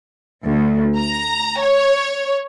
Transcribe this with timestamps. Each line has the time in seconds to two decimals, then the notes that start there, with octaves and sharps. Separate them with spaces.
0.45 D2
0.99 A#5
1.61 C#5